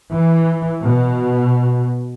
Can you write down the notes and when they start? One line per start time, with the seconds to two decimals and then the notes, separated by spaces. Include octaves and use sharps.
0.13 E3
0.85 B2